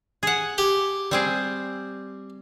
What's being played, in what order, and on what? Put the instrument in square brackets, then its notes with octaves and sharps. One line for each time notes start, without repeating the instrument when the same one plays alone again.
[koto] G#4 F#5
[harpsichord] G4
[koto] G3 C4 G#4